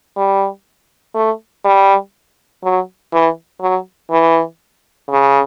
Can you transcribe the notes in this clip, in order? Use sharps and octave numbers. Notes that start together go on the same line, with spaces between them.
G3
A3
G3
F#3
E3
F#3
E3
C#3